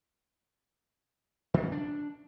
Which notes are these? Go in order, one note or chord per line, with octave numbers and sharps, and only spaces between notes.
D#3
C#4
D4